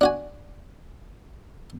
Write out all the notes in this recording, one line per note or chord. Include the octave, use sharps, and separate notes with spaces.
D4 F#4 G#5